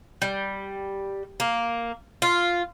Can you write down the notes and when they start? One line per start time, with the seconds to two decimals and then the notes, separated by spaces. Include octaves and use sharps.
0.22 G3
1.40 A#3
2.22 F4